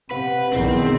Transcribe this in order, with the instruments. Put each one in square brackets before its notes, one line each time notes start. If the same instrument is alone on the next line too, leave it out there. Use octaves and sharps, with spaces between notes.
[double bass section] C3 [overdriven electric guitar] B4 [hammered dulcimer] F#5
[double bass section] B1 E2 D#3 [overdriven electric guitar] C4